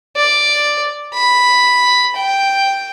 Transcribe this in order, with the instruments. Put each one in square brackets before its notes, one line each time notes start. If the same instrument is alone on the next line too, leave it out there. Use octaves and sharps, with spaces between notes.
[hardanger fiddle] D5
B5
G5